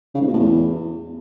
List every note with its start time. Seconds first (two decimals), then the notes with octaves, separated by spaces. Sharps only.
0.15 C#3
0.21 G#2
0.27 B2
0.33 A2
0.39 E2